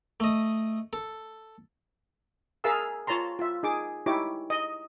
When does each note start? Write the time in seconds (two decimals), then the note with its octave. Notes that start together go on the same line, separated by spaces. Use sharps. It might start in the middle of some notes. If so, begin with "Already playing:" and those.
0.20 A3 D#5
0.93 A4
2.64 G#4 A#4 E5 F5 A5 E6
3.07 F4 C#5 A5 A#5 C6
3.39 F4 E5
3.63 D#4 G#4 D6
4.06 D#4 E4 G4 C#5 D6
4.50 D#5